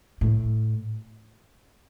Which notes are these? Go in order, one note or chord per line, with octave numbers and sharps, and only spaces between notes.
A2